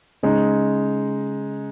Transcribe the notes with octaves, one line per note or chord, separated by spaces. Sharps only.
C#3 G#3 D#4